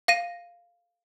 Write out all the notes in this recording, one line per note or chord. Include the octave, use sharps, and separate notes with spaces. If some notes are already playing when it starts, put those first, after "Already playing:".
F5 A#6 D#7